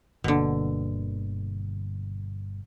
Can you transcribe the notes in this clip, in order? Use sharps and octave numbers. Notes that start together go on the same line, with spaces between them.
G1 B2 D3 A#3